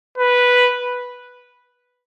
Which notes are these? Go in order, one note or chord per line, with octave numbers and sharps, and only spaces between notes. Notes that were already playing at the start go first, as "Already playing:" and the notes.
B4